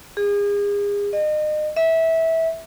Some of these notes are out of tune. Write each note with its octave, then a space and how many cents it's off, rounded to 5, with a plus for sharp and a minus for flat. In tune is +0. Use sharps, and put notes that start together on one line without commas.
G#4 -35
D#5 -35
E5 -20